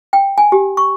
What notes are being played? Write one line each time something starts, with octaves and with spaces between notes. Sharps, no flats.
G5
G#5
G4
C#6